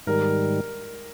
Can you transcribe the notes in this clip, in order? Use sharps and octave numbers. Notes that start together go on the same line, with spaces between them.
G#2 D#3 G3 A#4